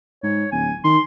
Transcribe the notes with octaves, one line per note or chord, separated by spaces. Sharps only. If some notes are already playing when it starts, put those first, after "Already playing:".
G#2 C#5
D1 G#5
D#3 C6